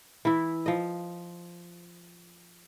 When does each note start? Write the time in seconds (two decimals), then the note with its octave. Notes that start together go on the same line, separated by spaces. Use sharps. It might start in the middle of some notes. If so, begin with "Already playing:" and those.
0.25 E3 E4
0.66 F3 D#5